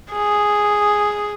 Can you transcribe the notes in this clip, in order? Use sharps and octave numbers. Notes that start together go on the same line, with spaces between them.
G#4